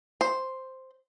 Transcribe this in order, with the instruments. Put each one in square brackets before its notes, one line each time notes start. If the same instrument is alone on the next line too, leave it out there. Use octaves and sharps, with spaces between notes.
[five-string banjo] C5